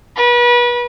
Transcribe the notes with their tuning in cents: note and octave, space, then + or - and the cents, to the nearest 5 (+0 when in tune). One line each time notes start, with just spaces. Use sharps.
B4 -35